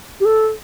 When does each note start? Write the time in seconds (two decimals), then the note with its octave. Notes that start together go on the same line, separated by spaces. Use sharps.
0.20 G4
0.25 A4